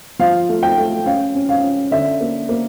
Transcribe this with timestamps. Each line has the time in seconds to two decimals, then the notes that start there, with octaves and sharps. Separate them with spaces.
0.19 F3 F5
0.49 A3
0.63 G5
0.77 A3
1.06 C#4 F5
1.35 C#4
1.49 F5
1.62 C#4
1.91 D3 E5
2.21 A#3
2.49 A#3